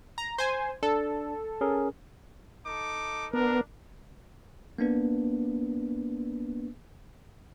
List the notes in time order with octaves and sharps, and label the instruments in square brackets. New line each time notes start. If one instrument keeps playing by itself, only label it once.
[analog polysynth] A#5
C5 G#5
[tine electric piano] D4 [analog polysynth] A4
[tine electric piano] C#4 G#4 A#4
[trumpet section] D#4 A4 D6
[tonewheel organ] B3 [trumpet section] D4 [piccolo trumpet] A#4
[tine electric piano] A#3 B3 D4 B4